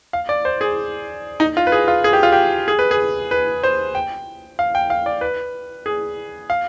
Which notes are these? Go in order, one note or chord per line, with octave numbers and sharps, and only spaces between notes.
F5
D5
C5
G#4
D#4
F4
B4
G#4
F4
G#4
G4
F4
G4
G#4
B4
G#4
B4
C5
G5
F5
G5
F5
D5
B4
G#4
F5